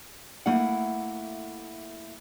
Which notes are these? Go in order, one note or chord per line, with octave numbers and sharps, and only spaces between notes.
A3 A#3 E4 F#5